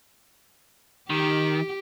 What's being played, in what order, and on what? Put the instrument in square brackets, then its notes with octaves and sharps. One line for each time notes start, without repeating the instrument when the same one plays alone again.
[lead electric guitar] D#3 [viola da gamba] G4